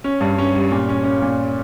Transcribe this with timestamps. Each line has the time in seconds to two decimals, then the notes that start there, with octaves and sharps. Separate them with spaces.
0.04 C#4
0.21 G2
0.38 C#4
0.55 G3
0.72 A#2
0.89 C#4
1.04 C#4
1.22 A#2